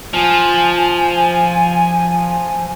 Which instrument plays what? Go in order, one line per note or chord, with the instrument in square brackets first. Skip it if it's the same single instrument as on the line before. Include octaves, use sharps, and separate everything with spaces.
[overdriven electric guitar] F3 [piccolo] G#5